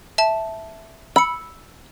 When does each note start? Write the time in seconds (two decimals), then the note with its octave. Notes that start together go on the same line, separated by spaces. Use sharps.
0.18 E5 A5
1.16 B5 E6 C#7